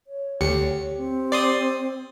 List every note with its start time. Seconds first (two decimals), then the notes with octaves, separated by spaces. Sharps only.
0.07 C#5
0.41 D2 G4 C#7
0.97 C4
1.32 D5 C6 D#6